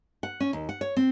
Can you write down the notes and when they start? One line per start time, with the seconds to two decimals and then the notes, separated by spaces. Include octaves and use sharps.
0.23 F#5
0.40 C#4
0.53 D#2
0.69 F#5
0.81 C#5
0.97 C4